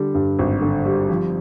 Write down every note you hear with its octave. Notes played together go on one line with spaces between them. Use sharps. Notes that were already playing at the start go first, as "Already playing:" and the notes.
Already playing: D3 G3
G2
G#1
D3
G3
F3